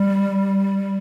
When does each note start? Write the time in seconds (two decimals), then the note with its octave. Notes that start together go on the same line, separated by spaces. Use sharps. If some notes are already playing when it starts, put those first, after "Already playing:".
Already playing: G3